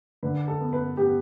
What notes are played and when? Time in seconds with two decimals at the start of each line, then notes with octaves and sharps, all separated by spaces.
0.23 D3 B4
0.48 A4
0.60 B3
0.73 B4
0.97 B3 G4